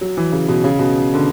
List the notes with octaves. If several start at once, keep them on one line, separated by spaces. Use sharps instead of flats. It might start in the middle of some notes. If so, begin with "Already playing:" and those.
F#3
E3
C#3
B2
C#3
B2
D3